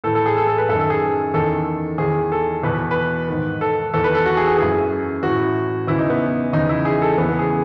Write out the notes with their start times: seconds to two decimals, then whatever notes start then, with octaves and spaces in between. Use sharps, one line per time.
0.04 A2 E3 A4
0.15 A4
0.26 G#4
0.37 A4
0.47 A4
0.58 B4
0.69 F#2 A4
0.73 D#3
0.80 A4
0.90 G#4
1.34 E2 D#3 A4
1.98 E2 D#3 G#4
2.32 A4
2.63 E2 B2 B4
2.91 B4
3.28 G#2 D#3
3.61 A4
3.94 E2 D#3 A4
4.04 B4
4.15 A4
4.25 F#4
4.37 G#4
4.47 G#4
4.58 F#2 E3 G#4
5.23 A2 E3 F#4
5.87 E2 C#3 E3 E4
5.99 D#4
6.10 B3
6.53 E2 C#3 E3 D#4
6.69 E4
6.85 G#4
7.02 A4
7.17 E2 C#3 E3 B3
7.29 B3
7.39 G#4